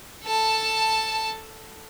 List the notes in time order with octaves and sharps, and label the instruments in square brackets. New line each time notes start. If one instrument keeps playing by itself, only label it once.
[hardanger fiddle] A4 A5